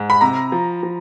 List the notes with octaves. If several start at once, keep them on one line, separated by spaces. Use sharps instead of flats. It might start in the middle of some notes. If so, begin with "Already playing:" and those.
Already playing: G#2
B5
C3 A#5
F3
F3